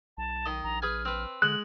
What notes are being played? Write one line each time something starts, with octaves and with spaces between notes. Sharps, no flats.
B1 A5
D#3 D#5
A#1 A#5
G#4 B4 G#5 F6
C4 B4
D3 G#3 F#6 F#7